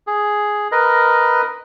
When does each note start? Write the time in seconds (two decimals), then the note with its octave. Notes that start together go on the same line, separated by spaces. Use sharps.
0.07 G#4
0.72 A#4 B4 D#5